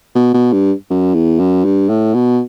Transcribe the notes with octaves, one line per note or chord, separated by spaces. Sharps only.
B2
B2
G2
F#2
E2
F#2
G2
A2
B2